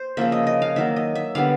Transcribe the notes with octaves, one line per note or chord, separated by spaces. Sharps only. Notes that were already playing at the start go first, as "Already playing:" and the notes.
Already playing: C5
C#3 F3 A#3 E5
D#5
D#5
F5
D#3 F#3 A#3 E5
D#5
E5
D3 G3 B3 F5